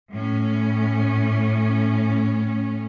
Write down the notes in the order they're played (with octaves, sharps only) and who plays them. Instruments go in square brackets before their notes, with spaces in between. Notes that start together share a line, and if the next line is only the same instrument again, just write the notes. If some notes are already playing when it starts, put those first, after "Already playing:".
[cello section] A2 C#4